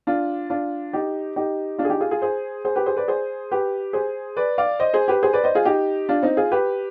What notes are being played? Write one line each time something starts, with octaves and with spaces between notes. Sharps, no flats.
D4 F4
D4 F4
D#4 G4
D#4 G4
D4 F4
G#4
D#4 G4
F4 G#4
F4 G#4
G#4 C5
G#4 C5
G4 B4
G#4 C5
B4 D5
G#4 C5
G4 B4
G#4 C5
B4 D5
D5 F5
C5 D#5
G#4 C5
G4 B4
G#4 C5
B4 D5
C5 D#5
F4 G#4
D#4 G4
D4 F4
C4 D#4
F4 G#4
G4 B4